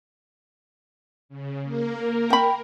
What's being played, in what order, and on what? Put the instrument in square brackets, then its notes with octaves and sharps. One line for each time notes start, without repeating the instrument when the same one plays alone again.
[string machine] C#3
A#3 A#4
[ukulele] G5 B5